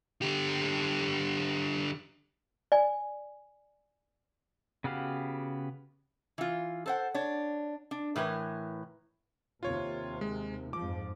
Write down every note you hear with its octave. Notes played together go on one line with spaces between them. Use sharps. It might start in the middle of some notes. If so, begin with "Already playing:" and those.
D3 G4
D5 G#5
C#3 B3 F#4 G4 F5
E3 F4
A4 C5 F#5
D4 C#5
D4
A2 E3 A#4 B4
D#2 C3 F4 C#5
G#3
F2 G#2 F3 D6